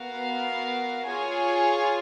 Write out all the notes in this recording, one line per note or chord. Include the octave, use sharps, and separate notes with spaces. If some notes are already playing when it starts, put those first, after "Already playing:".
Already playing: B3 F#4 A#4 F5
F4 G#4 C#5 G#5